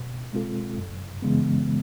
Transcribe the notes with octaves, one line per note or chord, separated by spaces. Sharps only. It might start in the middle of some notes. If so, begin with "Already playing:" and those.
Already playing: B2
G#3 C4 F4 A4
F#2
C#3 E3 G#3 B3